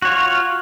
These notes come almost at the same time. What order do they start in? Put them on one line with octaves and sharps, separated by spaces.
F#4 C#5 F4